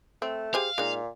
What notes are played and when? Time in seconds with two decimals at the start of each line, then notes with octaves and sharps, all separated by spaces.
0.22 A3 C4
0.54 G4 G#4 C5 F5
0.78 A#2 G#3 D#4